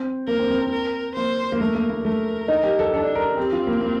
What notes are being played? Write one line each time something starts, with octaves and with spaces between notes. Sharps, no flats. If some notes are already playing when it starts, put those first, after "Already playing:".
Already playing: C4
A#3 A#4
C4
C4
C4
A#4
A#3 C5
A#3
A3 A#4
A#3
A#3
A3 A#4
D#4
G4
A4
D4 A4
A#4
C4 G4
F4
A#3
A#3